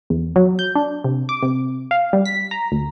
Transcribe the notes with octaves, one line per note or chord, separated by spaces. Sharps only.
E2
F#3
G6
D4
C3
D6
C3
F5
G3
B6
A#5
D2